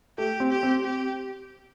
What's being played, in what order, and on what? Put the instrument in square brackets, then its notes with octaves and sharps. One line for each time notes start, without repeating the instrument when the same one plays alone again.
[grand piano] A3 [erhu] G4
[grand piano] C4
[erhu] G4
[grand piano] C4
[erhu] G4